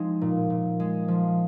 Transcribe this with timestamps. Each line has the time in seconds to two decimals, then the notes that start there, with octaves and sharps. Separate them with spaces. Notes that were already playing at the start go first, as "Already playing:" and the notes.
Already playing: F3 G#3 C4 D#4 C5 D#5
0.21 A#2
0.50 A#2
0.80 G#3
1.08 F3